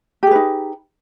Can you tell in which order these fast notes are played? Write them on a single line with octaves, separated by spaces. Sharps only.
G4 G#4 B4 D#4